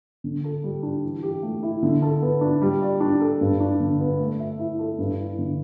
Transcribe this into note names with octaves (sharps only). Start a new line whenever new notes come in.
D3
A4
G3
D4
E3
G4
A3
E4
D3
A4
B3
D4
G3
D5
D4
A4
G2
D4
D3
B3
A3
E5
E4
A4
G2
E4
D3